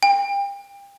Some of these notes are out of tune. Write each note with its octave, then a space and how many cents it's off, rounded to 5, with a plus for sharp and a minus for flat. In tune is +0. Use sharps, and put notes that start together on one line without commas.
G5 +35